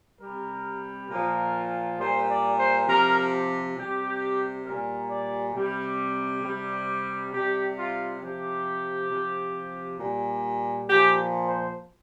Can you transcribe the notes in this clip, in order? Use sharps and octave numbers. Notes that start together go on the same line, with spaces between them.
C3 G3 A#4
A#2 F3 A#4
A#2 G3 C5
D5
C5
C3 F3 A#4
G4
C3 G3 G4
A#2 G3 A#4
D5
C3 G3
C3 G3
C3 G3 G4
F4
C3 F3 G4
C3 F3
A#2 G3
A#2 F3 G4
C5